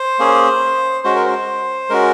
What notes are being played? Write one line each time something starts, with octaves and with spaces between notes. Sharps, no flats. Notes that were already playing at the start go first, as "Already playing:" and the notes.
Already playing: C5
A#3 C#4 G#4
G#3 C#4 F#4 C5
A#4
C5
G#3 C#4 F#4 A#4